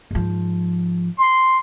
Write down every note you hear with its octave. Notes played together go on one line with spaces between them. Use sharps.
G#2 F3
C6